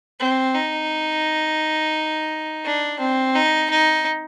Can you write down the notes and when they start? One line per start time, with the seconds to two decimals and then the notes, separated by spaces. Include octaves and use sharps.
0.20 C4
0.55 D#4
2.65 D4
3.00 C4
3.35 D#4
3.70 D#4